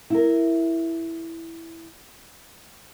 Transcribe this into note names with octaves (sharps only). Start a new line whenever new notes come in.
E4 A#4